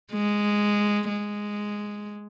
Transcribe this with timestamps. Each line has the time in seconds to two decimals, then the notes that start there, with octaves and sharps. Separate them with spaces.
0.12 G#3
1.09 G#3